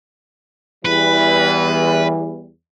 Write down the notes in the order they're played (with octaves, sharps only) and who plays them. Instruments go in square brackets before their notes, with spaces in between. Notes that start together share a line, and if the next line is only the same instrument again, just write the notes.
[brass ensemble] E2 E3 G3 [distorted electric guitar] B4